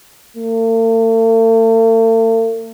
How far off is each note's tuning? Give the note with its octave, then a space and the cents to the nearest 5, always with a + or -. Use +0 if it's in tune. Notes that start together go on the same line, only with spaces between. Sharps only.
A3 +45